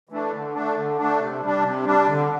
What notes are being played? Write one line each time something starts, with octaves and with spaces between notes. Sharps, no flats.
E3 A3 D4
D3
A3 D4
D3
A3 D4
C3
G3 D4
C3
G3 D4
D3